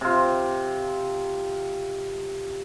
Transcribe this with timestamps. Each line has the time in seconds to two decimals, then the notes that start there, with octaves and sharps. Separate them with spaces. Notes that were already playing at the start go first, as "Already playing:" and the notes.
0.01 C3 F4